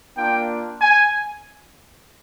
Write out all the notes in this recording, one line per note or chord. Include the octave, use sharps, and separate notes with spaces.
A#3 D4 F4 G5
G#5